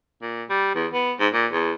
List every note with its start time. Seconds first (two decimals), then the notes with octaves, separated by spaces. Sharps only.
0.22 A#2
0.49 G3
0.75 E2
0.93 B3
1.20 G#2
1.33 A#2
1.52 E2